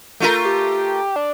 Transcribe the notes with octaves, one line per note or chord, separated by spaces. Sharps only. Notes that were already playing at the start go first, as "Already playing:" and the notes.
A3 F4 A#4
G4
D4